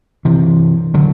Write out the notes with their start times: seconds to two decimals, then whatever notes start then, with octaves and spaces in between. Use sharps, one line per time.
0.25 C3 E3
0.94 D3 F#3